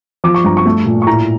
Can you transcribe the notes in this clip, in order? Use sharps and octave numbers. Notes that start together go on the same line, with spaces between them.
F3 D6
C#6
G2 A#5
C#6
A3
A#2
C#6
A2 A#5